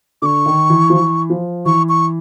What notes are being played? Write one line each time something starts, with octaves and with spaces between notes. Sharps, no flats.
D3 C#6 D6
D#3
E3
F3
E3
F3
E3 C#6
C#6